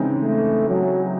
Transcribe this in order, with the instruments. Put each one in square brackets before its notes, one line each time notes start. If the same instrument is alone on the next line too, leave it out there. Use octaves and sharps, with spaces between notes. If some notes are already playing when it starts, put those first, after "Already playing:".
Already playing: [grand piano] C#3 E3 G#3 C4 D#4
[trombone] A3
F#3